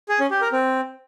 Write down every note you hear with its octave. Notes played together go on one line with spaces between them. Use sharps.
G#4
C#4
G4
A#4
C4